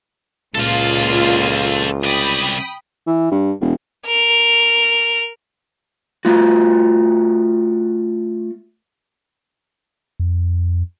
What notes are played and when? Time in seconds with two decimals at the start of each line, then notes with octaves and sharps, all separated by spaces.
0.55 C#2 A#2 F4 A4 F5
2.04 C2 D5 G5 B5 D#6
3.07 E3
3.31 G2
3.61 E1
4.07 A#4
6.25 A3 F4 F#4
10.20 F2